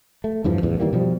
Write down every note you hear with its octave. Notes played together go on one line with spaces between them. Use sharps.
A3
E2 G2 E3 F3
D1 A1 E2
D#3 E3 G3 A#3
B2 F3 G3